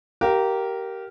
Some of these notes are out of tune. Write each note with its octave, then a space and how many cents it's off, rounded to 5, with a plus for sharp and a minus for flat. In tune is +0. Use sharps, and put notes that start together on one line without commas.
G4 -20 A#4 +0 F5 +0